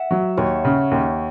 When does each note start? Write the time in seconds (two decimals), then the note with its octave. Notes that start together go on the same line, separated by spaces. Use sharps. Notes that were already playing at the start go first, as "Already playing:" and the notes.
Already playing: E5 F#5
0.11 F#3
0.37 D#2 C#5
0.65 C#3
0.91 D#2